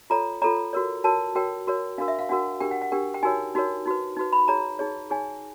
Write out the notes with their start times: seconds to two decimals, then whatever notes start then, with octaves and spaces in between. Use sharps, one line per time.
0.10 F4 A4 C#5 A#5
0.42 F4 A4 C#5 A#5
0.73 F#4 A#4 C#5
1.04 F#4 A#4 C#5 A5
1.35 F#4 A#4 C#5 G5
1.67 F#4 A#4 C#5
1.98 D4 F#4 A#4 F5
2.08 E5
2.19 F5
2.29 D4 F#4 A#4 F#5
2.60 D4 G4 A#4 G5
2.71 F#5
2.82 F#5
2.92 D4 G4 A#4 G5
3.14 G5
3.23 D#4 F#4 A#4 C#5 G#5
3.55 D#4 F#4 A#4 C#5
3.86 D#4 F#4 B4
4.17 D#4 F#4 B4
4.33 B5
4.48 D#4 G#4 C#5 A#5
4.79 D#4 G#4 C#5
5.10 D#4 G#4 C#5 G#5